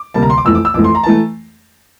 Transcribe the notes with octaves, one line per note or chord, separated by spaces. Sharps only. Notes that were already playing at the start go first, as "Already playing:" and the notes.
Already playing: D6
D2 C3 G3 A#3 A5
A#5
C6
D6
F2 E3 A3 E6
D6
E6
F2 E3 A3 D6
C6
A#5
E3 A3 A5